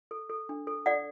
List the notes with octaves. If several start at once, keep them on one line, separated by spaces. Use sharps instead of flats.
A4
A4
D4
A4
A4 D5 F#5